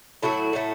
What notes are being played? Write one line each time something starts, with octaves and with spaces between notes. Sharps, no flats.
A2 F#3 A3 E4 F#4
A2 F#3 A3